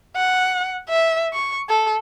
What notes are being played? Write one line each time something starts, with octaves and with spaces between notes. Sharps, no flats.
F#5
E5
C#6
A4